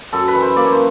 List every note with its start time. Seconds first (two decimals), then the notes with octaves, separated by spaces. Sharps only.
0.13 F#2 A4
0.28 B4
0.35 E3
0.42 C5
0.56 A#3 D5
0.64 C#5
0.72 C5